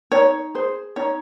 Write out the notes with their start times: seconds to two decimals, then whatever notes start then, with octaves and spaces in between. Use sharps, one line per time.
0.12 D#4 C#5
0.55 G#4 C5
0.96 D#4 C#5